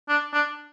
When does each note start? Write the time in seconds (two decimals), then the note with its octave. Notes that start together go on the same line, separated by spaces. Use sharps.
0.09 D4
0.33 D4